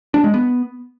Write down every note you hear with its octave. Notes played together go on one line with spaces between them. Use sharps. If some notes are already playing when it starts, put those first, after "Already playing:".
D4
G#3
B3